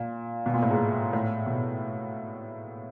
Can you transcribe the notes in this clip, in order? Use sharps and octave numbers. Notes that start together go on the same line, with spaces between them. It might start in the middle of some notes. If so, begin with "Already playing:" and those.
Already playing: A#2
B2
A#2
A2
G#2
A2
B2